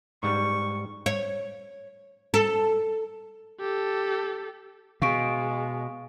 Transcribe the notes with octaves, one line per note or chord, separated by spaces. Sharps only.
G#2 G3 C#6
C#5
A4
G4 A4
B2 G#3 F5 C#6 D7